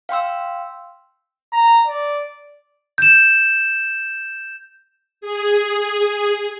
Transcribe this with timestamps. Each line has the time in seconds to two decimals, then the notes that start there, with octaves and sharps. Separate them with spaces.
0.09 F5 G5 C6 E6
1.52 A#5
1.87 D5
2.98 G6 E7
5.21 G#4